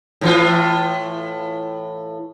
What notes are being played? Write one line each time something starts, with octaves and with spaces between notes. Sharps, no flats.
A2 E3 F4